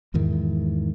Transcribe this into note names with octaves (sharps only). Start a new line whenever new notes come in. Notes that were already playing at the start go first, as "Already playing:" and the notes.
E2 G#2 D#3 E3